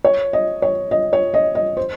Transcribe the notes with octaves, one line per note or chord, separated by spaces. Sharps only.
C#5
D#5
C#5
D#5
C#5
D#5
D#5
C5